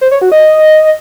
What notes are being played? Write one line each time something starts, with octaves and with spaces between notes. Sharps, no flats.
C5
C#5
F#4
D#5